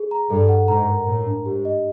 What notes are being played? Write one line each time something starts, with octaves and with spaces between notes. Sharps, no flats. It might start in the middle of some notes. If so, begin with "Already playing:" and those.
Already playing: G#4
A#5
G2 A4
F#5
G#2 A#5
A#4
A2 A#4
D4
G#2 G4
D#5